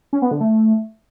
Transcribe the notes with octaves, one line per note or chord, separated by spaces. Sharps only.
C#4
B3
D3
A3